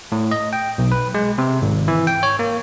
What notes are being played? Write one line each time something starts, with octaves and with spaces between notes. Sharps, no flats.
A2
D#5
G5
B1
B4
G#3
C3
G#1
E3
G5
C#5
A#3